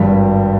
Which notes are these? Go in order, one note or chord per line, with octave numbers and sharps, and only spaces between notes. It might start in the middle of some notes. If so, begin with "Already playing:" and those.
Already playing: G#1 G2 G3